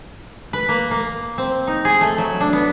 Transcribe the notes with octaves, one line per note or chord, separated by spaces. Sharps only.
B4
A#3
A#3
C4
D#4
G#4
A3
F#3
D4
B3